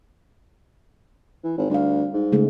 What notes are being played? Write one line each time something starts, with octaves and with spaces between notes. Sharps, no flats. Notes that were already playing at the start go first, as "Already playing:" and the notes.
E3
G#1
D2 G3 F5
G#2
C#3 G#3 A3